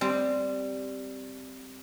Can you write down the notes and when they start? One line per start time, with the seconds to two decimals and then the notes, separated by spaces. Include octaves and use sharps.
0.01 G3 C4